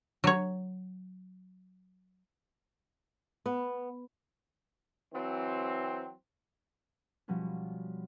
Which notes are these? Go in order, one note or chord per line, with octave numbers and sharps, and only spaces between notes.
F#3 C#5
B3
E3 F#3 C4
B2 F3 G3 B3 C#4